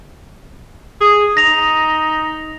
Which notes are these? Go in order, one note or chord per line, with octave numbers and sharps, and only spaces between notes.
G#4
D#4 A#6 F7